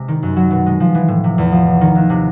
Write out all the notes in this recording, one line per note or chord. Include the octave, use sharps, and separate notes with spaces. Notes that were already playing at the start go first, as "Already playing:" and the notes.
Already playing: C3 G#3
D#3
F#2
F#3
B2
G#3
F3
E3
A2
C3
E2
F3
C3
D#3
D#2
C3